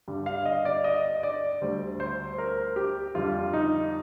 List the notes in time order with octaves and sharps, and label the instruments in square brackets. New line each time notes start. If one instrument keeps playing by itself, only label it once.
[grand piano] G2 D3 G3
F5
D#5
D5
D#5
D5
D2 D3 G3 C5
C5
A#4
G4
F2 D3 G3 F4
D#4